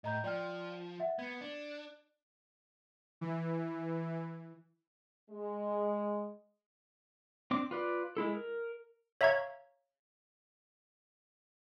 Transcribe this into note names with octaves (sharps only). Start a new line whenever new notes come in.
A2 D#5 A#5 G6
F3 D5 G5 F6
E5 F#5
B3 G#6 C#7
D4
E3
G#3
C4 D4 D6
F4 B4 D5
G#3 E4 A4
A#4
C#5 E5 F5 A#5 C#6 G#6